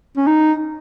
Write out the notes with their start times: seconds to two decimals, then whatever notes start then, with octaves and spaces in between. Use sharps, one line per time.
0.17 C#4
0.27 D#4